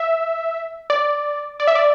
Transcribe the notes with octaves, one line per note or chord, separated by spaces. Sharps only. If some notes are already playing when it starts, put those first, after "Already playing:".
Already playing: E5
D5
D5
E5
D5